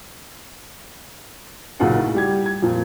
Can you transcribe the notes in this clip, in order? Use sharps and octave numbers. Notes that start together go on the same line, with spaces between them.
B1 A#2 C#3 F4 F#5 G#5
A2
G3 G4 G#6
G#6
F2 A#2